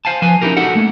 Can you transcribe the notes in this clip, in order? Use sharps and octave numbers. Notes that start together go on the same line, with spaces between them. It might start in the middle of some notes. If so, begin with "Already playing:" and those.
C5 F5 G#5 A5
F3 B4 G#5
C#4 D#4 E4 F#4 G4 A#4
D#4 F#4 A4 E5 F#5
A3 A#3